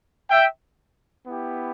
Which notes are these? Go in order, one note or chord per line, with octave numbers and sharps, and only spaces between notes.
E5 G5
B3 E4 G4